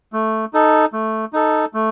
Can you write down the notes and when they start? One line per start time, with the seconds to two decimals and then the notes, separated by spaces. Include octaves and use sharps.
0.13 A3
0.54 D#4 A4
0.93 A3
1.33 D#4 A4
1.74 A3